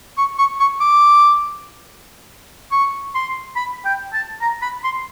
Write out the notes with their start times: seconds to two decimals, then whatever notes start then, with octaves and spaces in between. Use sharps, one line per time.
0.18 C#6
0.38 C#6
0.60 C#6
0.81 D6
2.72 C#6
3.15 C6
3.56 B5
3.85 G5
4.13 A5
4.41 A#5
4.62 B5
4.84 C6